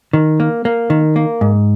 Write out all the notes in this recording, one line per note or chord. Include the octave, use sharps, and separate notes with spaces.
D#3
A#3
A#3
D#3
A#3
G#2